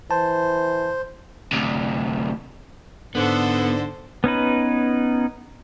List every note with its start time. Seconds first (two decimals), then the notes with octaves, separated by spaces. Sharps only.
0.11 E3 C5 A5
1.53 D2 C3
3.15 G#2 D3 B3 A4 C5
4.24 B3 C#4 D#4 B4